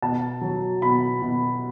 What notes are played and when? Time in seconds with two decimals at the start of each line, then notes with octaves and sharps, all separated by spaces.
0.02 B2 A5
0.41 F#3
0.82 B2 B5
1.22 B2